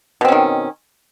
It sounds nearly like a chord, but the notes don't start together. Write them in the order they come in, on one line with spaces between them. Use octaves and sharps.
B2 C4 C#4 D#3